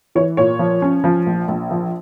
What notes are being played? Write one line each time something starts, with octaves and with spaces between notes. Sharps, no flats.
E3 C#5
A#2 C#5
F3
C#4
F3
A#1
A#1
F3